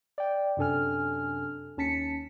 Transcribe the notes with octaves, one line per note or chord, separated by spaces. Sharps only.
D5 G5
F#2 C3 D4 A4 G#5 F6
D#2 C#4 A5 B6 C#7